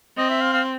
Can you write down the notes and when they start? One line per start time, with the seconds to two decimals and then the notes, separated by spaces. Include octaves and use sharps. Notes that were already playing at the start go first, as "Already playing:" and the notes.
0.17 C4 D#5
0.30 E5
0.41 F5
0.53 F5